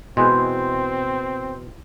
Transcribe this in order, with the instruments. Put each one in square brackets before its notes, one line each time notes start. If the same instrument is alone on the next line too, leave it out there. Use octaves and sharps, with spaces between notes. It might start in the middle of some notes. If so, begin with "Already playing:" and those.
[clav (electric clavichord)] B2 [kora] E3 G#3 E4 [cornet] C4 [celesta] C6 F#6 G6